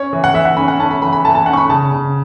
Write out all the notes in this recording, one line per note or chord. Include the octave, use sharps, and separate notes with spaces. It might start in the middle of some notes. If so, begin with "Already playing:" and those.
Already playing: C#4 C#5
E3
F#5
E3 E5
F#5
C#4 B5
F#5
C#4 A5
B5
E3 B5
B5
E3 A5
A5
C#4 F#5
C#6
B5
C#3 A5
C#3